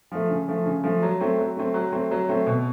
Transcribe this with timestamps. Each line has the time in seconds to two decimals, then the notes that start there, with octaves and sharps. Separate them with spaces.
0.12 F3 A3
0.30 C#3
0.48 F3 A3
0.66 C#3
0.84 F3 A3
1.03 F#3
1.21 A3 C4
1.38 F#3
1.57 A3 C4
1.74 F#3
1.92 A3 C4
2.11 F#3
2.29 A3 C4
2.47 B2